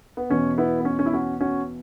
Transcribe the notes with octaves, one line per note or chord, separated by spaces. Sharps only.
B3
E2 B2 C#4
B3 E4
B3
C#4
C#4
E4
C#4 F#4
C#4 F#4